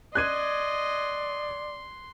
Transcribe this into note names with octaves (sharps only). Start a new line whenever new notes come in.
D5 D#5 C6 F#6 G#6 D#7